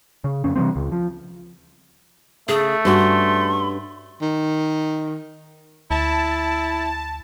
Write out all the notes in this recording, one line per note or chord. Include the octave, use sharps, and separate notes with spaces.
C#3
F2 C#3 C#4
C3 E3 G3 C4
C#2
F3
C#3 A3 G#4
G2 C#4 F#4 C6
D#3
D2 E4 A5